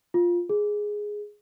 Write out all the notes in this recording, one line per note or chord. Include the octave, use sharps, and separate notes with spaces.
F4
G#4